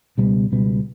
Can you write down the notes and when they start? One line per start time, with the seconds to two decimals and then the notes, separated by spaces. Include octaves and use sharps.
0.18 C#2 B2 G3 B3
0.52 C#2 B2 G3 B3